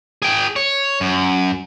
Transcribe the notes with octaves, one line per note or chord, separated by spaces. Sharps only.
G#4 G5
C#5
F#2